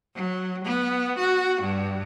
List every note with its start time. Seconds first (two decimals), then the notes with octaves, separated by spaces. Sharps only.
0.15 F#3
0.64 B3
1.18 F#4
1.62 G2